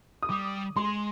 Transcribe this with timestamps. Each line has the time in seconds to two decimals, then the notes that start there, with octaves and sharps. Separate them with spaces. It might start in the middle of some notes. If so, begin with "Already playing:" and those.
0.23 D#6
0.29 G3 D6
0.76 G#3 C6